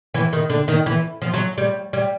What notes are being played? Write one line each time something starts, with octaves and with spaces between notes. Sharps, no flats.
E3
D#3
D3
D#3
E3
F3
F#3
G3
G3